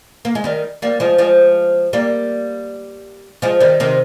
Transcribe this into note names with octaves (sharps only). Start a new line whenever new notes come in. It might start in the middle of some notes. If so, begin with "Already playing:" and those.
A#3
G#3
D#3 G3
G3 A#3
F3 G#3
F3 G#3
G3 A#3
F3 G#3
D#3 G3
C3 D#3